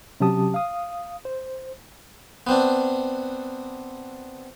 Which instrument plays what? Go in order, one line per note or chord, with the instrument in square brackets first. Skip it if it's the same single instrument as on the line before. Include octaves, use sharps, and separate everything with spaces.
[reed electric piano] C3 F#3 C#4 G4 A5 D#6
F5 D#6
C5
[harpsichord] B3 C4 D4